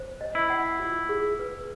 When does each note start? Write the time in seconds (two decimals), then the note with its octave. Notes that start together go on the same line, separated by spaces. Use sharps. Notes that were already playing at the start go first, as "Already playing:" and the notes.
Already playing: C5
0.21 D#5
0.35 E4
0.50 F#5
0.80 F4
1.09 G#4
1.39 B4